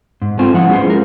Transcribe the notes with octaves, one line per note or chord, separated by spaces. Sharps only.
G#2
G#3 A3 C4 F4 C5 G#5
F3 E4 F4 F#5
G#3 C#4 G#4 B4 C5
F4 A#4